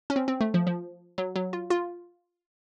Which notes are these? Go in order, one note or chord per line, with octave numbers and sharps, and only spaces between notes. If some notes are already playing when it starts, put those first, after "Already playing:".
C#4
C4
C4
A3
F3
F3
F#3
F#3
F4
F4